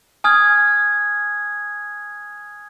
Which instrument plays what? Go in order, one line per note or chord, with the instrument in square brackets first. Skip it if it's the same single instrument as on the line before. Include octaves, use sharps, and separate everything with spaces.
[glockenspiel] G#5 D#6 F6 G#6